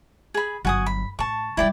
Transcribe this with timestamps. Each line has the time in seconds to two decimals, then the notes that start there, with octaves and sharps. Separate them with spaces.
0.34 G#4 B5
0.65 G1 F#3 F#4 G#5 D#6
0.86 B5
1.19 A2 A5 C#6
1.57 F3 G3 E4 D5 G5